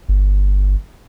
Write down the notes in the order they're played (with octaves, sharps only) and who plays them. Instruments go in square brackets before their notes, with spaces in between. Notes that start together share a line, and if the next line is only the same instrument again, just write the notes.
[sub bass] G1